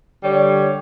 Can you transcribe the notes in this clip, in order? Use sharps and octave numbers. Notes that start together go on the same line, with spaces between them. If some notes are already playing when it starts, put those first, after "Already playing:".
D3 G3 C#5